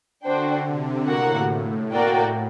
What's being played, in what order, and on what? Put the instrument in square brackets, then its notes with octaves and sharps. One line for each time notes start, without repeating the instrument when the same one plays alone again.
[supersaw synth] D3 [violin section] D4 F#4 C5 G5
[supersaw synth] C3
[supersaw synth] A2 [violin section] A#3 F#4 A#4 F#5
[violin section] A#3 F#4 A#4 D5 G5